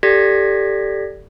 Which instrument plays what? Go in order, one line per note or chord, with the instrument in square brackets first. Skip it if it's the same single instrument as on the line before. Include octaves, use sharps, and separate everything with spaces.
[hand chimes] G4 A4 D5 G#6 A#6 B6